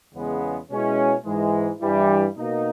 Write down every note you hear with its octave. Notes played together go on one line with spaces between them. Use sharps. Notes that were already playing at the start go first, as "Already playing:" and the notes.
E2 C#3 G#3 B3
B2 G#3 C#4 E4
G#2 E3 G#3
G2 E3 G3
B2 A#3 D#4